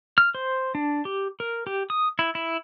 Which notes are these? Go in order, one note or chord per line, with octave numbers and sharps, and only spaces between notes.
F6
C5
D4
G4
A#4
G4
D#6
E4
E4